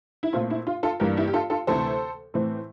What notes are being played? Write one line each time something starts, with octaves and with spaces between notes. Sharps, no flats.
E4
A#2 A3 C4 F4
E4
F4
F4 A4
G2 E3 G3 A#3 G4 A#4
E4 G4
G4
F4 A4
F4 A4
D2 C3 E3 A3 A4 C5
A2 E3 A3 C4